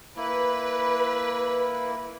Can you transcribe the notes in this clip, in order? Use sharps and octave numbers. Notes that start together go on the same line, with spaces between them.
A#3 E4 B4